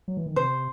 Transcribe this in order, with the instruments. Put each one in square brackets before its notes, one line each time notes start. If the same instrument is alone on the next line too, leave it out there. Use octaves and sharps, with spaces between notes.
[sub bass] F#3
E3
D#3
[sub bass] C3 [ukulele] C5